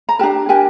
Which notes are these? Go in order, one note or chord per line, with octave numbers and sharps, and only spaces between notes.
A#5
D4 G4 A#4 A5
D4 G4 A#4 G#5